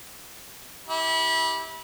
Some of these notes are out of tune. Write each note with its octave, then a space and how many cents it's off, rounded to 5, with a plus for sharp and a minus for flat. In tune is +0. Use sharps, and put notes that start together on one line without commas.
E4 -25 G4 +5